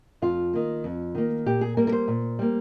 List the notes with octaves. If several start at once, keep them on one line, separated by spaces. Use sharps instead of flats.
F2 F4
D#3 A#3
F2
D#3 A#3
A#2 G4
G#4
G3 A#3 A#4
A#4
C5
A#2
G3 A#3